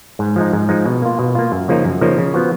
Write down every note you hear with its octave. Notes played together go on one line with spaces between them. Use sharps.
G#2
F3 G#3 D#4
G#2
F3 G#3 D#4
B2
A#3 F4
B2
A#3 F4
F#2
C#3 F3 A#3 D#4
F#2
C#3 F3 A#3 D#4
C#3
F3 B3 F#4